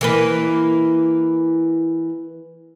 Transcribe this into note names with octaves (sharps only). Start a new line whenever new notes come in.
E3 A#3 B4